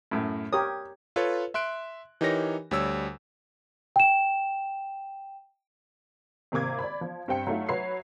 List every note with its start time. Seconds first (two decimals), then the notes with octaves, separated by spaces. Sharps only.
0.11 F#2 A2
0.53 G4 A#4 C#5 D#6
1.16 F4 A4 B4 C#5
1.54 E5 C6 F#6 D7
2.21 E3 D#4 G4 A#4 C#5 A#6
2.71 D2 G3 C#5 E6
3.96 G5 E7
6.52 G#1 C3 A#3 D6 G#6
6.79 D5 B5
7.01 F3
7.28 G2 C4 G5 C#7
7.47 F#3 A3 D#4 F4
7.69 F#3 B4 C#5 E5 C7